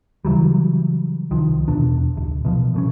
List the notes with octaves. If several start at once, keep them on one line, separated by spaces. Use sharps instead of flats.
C#3 E3 F#3 G3
C2 D#3 F3
E2 B2 D4
D1 D#2
B2 E3 F3
B2 A3 C#4